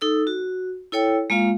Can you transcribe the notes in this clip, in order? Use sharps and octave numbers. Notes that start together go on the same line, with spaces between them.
D#4 A4 E6
F#4
E4 A4 C#5 G5 E6
G#3 A#3 F4 F5